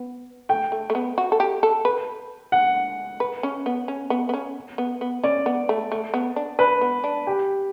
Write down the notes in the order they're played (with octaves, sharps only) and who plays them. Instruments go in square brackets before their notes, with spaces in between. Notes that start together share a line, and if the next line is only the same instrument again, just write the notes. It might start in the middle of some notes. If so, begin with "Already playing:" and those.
Already playing: [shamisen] B3
[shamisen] A3 [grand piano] G5
[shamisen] A3
A3
B3
F#4
A4
G4
A4
B4
[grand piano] F#5
[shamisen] B4
C#4
B3
C#4
B3
B3
C#4
B3
B3
[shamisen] C#4 [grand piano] D5
[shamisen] B3
A3
A3
B3
D4
[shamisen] D4 [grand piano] B4
[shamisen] B3
D4
[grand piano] G4